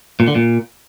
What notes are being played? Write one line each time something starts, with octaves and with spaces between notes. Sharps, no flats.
A#2
D3
A#2